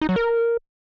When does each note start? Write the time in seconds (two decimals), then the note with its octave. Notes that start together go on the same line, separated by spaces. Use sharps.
0.02 D#4
0.09 F#3
0.16 A#4